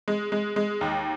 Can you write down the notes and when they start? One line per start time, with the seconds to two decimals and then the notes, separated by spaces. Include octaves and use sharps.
0.08 G#3
0.32 G#3
0.56 G#3
0.81 D#2